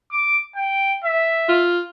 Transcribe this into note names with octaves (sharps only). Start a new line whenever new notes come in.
D6
G5
E5
F4